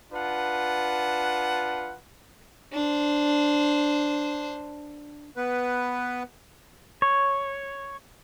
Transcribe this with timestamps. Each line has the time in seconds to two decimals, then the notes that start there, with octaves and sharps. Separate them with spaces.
0.12 D4 F4 B4 F#5 A5
2.73 D4 C5
5.36 B3 B4
7.02 C#5